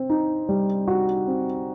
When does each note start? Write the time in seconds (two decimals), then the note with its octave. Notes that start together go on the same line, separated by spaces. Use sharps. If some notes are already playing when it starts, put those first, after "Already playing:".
Already playing: C4
0.10 D#4
0.49 G3
0.88 F#4
1.27 C4